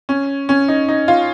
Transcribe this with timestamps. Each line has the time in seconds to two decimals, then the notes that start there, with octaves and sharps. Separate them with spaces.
0.09 C#4
0.49 C#4
0.68 D#4
0.88 D#4
1.08 F4